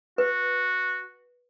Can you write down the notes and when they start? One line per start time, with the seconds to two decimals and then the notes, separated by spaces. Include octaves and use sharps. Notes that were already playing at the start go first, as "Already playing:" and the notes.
0.18 F#4 B4